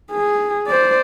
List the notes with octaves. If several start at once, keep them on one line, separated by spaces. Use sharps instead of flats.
G#4
C5 D5